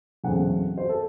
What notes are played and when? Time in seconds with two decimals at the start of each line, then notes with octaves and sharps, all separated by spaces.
0.24 E2 C#3 F#3 A3 C4 F#5
0.78 C5
0.89 A4